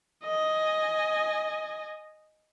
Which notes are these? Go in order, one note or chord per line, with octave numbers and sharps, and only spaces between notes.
D#5 G#5